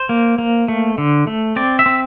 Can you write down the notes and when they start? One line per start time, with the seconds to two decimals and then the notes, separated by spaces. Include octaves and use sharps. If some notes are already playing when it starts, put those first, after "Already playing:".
Already playing: C5
0.09 A#3
0.38 A#3
0.68 A3
0.98 D3
1.27 A3
1.56 C4 D5
1.79 E5
1.86 C4